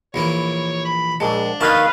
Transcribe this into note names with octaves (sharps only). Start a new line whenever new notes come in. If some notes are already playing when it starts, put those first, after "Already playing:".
A#1 E3 A#3 C#5
B5
A#1 G#3 D4 A5
D#3 A#3 B4 D#5 F5 A5